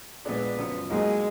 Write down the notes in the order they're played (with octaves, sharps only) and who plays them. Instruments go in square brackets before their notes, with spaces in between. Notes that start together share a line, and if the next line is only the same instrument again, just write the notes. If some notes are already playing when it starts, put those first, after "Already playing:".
[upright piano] A#1 A#2 G#3 D4 [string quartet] B3
[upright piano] F#1 F#2 F3
[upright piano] B1 B2 A#3 D#4 [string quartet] G#3